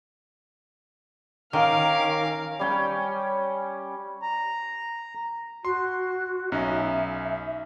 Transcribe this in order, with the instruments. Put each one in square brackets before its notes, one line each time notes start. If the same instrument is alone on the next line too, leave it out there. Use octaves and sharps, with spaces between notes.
[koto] D#3 [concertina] C#4 A#4 D6 [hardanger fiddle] F5
[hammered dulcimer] G3 C#4 G5
[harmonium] A#5
[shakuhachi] F#4 [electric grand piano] C6
[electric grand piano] B1 C#4 D#4 [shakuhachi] E5